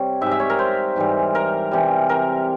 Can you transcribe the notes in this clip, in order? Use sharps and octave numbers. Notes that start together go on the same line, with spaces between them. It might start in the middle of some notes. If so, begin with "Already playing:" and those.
Already playing: C3 G3 C#5
G#2 G3 E5
E5
C#5
A#4
C5
G#2 E3 G3
A#4
C3 E3 G3
A#4